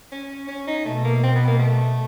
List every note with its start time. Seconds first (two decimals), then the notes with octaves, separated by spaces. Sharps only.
0.12 C#4
0.48 C#4
0.67 D#4
0.86 B2 A3
1.05 A#3
1.23 C4
1.36 B3
1.48 A#3
1.59 A3